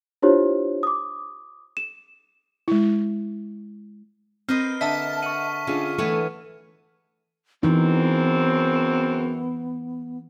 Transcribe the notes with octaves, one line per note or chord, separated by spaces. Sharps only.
D4 E4 F4 G4 C5 C#5
D6 D#6
E7
G#3 E4
C4 A#4 B4 D#5 F6
D3 D#5 E5 A5 B6
F#5 C#6 D#7
D3 C#4 F4 G#4
E3 A3 B3 C#5
F#2 C#3 E3 B3 C4 D#4